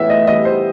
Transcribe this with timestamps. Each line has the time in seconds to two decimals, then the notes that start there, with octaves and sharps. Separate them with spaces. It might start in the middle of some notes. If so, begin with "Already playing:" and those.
Already playing: A2 E3 B3 E5
0.10 D#5
0.27 E3 G3 B3 D#5
0.45 C5